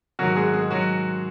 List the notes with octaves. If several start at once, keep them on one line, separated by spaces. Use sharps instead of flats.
G#2 D#3 F#3 F#4
G#3 G#4
G#3 G#4
F#3 F#4